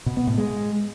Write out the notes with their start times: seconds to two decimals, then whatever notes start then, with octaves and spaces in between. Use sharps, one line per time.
0.06 B2
0.17 B3
0.27 A2
0.38 G#3